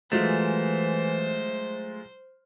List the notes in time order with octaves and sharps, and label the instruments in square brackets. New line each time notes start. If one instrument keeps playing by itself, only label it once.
[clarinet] E3 [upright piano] F#3 G#3 F4 [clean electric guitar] A3 [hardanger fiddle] C5